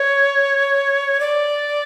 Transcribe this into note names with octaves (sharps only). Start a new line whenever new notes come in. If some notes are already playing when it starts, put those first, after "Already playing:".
Already playing: C#5
D5